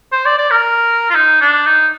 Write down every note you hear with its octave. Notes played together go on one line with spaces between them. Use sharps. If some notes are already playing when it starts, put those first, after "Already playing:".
C5
D5
D5
A#4
F4
D#4
D4
D#4